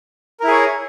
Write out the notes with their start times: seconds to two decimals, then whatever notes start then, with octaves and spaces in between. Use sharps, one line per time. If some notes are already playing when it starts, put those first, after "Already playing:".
0.40 A#4
0.44 E4
0.48 G#4
0.51 C#5